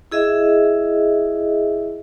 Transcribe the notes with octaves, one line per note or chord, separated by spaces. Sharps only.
E4 G#4 D#5 E5